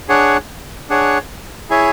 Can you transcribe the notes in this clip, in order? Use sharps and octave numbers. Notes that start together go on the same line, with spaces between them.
D4 G#4 C#5 F#5
D4 G#4 C#5 F#5
E4 G#4 C#5 E5 G#5